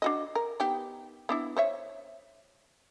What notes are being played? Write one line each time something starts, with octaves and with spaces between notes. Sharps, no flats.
D4 F#4 D#5
A#4
B3 D#4 G4
B3 D4 E4
C5 C#5 E5